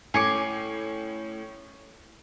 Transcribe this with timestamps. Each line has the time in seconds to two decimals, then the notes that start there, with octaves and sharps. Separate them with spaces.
0.14 A2 C#4 G#5 C#6 D6 C7